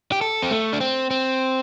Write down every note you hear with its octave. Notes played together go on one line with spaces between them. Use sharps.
G4
A4
C4
A3
D4
C4
C4